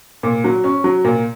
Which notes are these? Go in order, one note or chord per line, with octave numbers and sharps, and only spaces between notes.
A#2
F#3
C#4
F#3
A#2